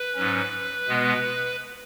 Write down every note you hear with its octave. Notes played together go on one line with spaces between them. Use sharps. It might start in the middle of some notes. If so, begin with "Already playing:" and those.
Already playing: B4
G#2 F#3 C#4
B2 G#3 B3